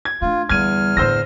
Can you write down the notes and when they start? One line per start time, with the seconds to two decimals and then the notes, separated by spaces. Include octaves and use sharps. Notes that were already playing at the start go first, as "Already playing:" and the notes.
0.05 G#6
0.22 A3 D4 F4
0.49 E2 D3 G3 F6 G#6 D#7
0.97 A2 D3 C5 E6 A#6